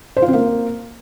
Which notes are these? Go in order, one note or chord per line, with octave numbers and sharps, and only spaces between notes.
C5
F4
C4
A#3